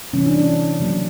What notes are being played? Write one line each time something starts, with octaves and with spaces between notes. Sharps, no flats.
C3 E3 G3 A#3 C#4
D4
C#4
C#3 F#3 A#3